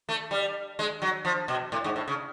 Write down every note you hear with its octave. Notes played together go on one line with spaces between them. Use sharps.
A3
G3
G#3
F#3
F3
B2
A2
G#2
A2
C#3